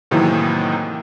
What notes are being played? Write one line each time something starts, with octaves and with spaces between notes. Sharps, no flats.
A2 C3 D#3 E3 F#3 A#3